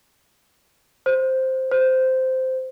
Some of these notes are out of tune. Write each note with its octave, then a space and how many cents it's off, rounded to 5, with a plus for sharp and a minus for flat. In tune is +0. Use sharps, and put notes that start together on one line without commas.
C5 +0
C5 -10